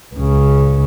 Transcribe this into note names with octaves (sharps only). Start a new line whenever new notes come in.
C#2 C#3